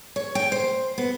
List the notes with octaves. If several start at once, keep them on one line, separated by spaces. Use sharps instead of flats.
C#5
G5
C5
B3